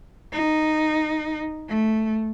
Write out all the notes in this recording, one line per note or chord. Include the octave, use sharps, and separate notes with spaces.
D#4
A3